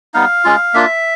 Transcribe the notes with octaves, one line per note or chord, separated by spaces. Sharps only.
G3 B3 D#4 F5
G#3 C#4 F4
A#3 D4 F4 E5